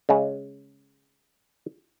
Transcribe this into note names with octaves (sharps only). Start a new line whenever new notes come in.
C#3 G#3